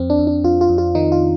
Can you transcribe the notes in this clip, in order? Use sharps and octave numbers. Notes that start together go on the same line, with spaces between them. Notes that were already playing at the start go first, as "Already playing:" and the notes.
Already playing: F2 C4
D4
F2
D4
F2 F4
F4
F2
F4
D#3 D#4
F4